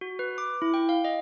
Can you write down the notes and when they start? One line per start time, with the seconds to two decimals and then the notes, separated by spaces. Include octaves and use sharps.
0.01 F#4
0.19 B4
0.38 D6
0.62 E4
0.74 G5
0.89 F5
1.05 D#5